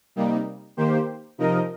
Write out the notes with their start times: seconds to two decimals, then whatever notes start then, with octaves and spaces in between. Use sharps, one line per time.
0.16 C3 G3 A#3 D#4
0.77 D#3 A#3 G4 C5
1.38 C3 F3 D#4 A#4 D#5